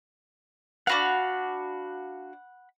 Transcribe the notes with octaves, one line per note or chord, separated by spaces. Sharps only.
D4 F#4 F5 F#5 B5